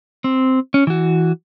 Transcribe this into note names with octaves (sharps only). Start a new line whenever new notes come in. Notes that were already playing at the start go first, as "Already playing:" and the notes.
C4
C#4
E3 F#4